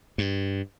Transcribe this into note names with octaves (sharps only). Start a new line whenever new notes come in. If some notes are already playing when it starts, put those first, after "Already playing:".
G2